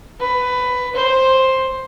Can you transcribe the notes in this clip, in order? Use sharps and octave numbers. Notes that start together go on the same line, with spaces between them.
B4
C5